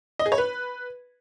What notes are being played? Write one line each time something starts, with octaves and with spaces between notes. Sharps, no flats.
D#5
G#4
C#5
B4